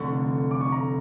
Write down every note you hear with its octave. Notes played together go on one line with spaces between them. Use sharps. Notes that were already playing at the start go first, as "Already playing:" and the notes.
Already playing: F1 F2 D3 C#6
D6
C#6
A#5